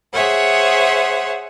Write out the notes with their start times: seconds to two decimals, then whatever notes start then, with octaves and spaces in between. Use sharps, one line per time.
0.13 G#4 C5 C#5 E5 F#5